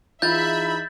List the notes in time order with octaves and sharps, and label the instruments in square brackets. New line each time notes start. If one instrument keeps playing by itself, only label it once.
[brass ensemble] E3 D#4 G#4 [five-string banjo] F4 [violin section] E5 B5 [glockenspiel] G6 A6